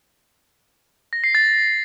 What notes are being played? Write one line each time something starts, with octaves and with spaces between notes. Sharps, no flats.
A#6
C7
A6